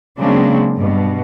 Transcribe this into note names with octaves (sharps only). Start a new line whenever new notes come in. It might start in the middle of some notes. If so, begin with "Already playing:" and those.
C#3 F#3 G#3 A#3 C4 D4
G2 B2